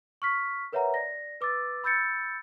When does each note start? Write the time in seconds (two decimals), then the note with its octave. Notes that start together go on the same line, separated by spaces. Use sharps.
0.22 C#6 F6 B6
0.72 A#4 B4 C#5 E5 F#5 A#5
0.94 D5 A#6
1.41 B4 D6 E6 A6
1.84 B5 E6 G6 A6 C#7